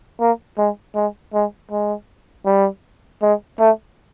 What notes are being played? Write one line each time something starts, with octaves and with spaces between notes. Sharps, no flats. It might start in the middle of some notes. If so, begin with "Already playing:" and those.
A#3
G#3
G#3
G#3
G#3
G3
G#3
A3